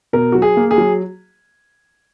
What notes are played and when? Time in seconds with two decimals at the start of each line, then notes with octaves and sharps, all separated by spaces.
0.13 B2 A#4
0.32 F#3 F#4
0.42 G#4
0.57 A#3
0.71 G#4
0.78 F#3